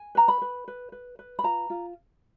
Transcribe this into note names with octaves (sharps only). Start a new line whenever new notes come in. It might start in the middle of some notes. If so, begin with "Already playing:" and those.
Already playing: G#5
B4 A#5
B5
B4
B4
B4
B4
B5
F4 A#5
F4